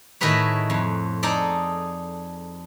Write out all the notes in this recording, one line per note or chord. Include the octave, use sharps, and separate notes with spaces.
A2 D#3 E4 G#4 B4 C#5
F2
D#4 G#4 A4 D5